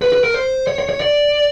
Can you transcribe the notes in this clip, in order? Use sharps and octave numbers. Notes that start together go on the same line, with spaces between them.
B4
B4
A#4
C5
C#5
C#5
C#5
D5